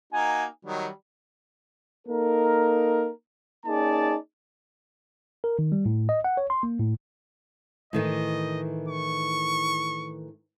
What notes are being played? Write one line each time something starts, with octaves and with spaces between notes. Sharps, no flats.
A#3 D#4 F#4 G#5
D#3 F#3 G3 D#5
A#3 D#4 A4 A#4
A#3 C#4 D#4 G#4 D5 A5
A#4
D#3
G3
A2
D#5
F#5
C#5
C6
A#3
A2
A2 D#3 E3 D#5
C#6